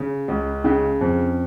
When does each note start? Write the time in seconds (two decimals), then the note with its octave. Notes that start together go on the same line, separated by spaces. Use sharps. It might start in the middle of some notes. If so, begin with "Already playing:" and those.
Already playing: C#3
0.28 C#2
0.64 C#3 C#4
1.01 F2